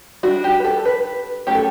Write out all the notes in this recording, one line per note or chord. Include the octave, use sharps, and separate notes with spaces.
G3 D4 F#4
G4
B4
A4
B4
F#3 A3 C#4 G4
A4